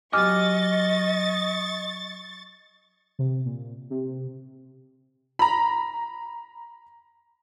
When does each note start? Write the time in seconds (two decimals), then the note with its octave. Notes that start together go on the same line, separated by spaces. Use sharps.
0.13 F#3 G4 D#5 G#5 C#6 D6 F6 A6
3.19 C3
3.46 A#2
3.90 C3
5.39 A#5 B5